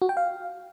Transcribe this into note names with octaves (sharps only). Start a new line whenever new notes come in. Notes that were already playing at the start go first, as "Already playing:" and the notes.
F#4
G5
F5